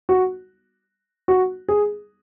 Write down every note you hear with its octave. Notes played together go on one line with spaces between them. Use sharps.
F#4
F#4
G#4